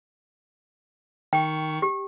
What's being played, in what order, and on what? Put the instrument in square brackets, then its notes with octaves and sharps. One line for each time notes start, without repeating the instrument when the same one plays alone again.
[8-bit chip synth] D#3 C#6 [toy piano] G5
[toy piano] G4